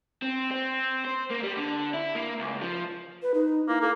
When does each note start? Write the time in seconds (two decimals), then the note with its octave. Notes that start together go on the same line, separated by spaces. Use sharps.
0.22 C4
0.51 C4
1.05 C5
1.30 A#3
1.43 G3
1.57 D3
1.94 E4
2.16 A#3
2.39 C#2
2.62 F3
3.22 B4
3.34 D#4
3.68 A#3 E4
3.81 A#3 A4